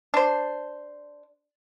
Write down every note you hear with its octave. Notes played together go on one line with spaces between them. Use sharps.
D4 C5